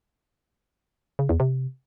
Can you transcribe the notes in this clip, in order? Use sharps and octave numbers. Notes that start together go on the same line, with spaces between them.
C#3
E2
C3